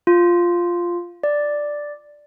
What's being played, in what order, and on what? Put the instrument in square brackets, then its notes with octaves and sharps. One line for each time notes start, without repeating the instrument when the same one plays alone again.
[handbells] F4
D5